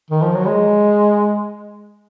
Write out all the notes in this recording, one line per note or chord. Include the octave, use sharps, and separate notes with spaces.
D#3
F3
F#3
G#3